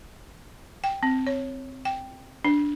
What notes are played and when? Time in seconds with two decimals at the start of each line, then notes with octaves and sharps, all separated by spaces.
0.84 G5
1.03 C4
1.27 C#5
1.85 G5
2.45 D4